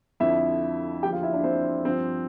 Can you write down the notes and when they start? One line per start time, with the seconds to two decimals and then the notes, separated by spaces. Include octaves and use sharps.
0.20 F2 D3 F3 E4 E5
1.03 E2 D3 F3 G4 G5
1.13 F4 F5
1.23 E4 E5
1.33 D4 D5
1.44 C4 C5
1.85 G2 F3 C4 C5